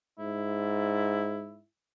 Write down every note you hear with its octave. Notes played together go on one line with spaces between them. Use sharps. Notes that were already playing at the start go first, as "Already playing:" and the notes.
G#2 E4